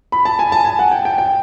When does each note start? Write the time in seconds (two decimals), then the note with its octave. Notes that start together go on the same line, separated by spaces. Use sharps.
0.12 B5
0.25 A5
0.39 G#5
0.52 A5
0.65 G#5
0.79 F#5
0.91 G5
1.05 G5
1.18 G5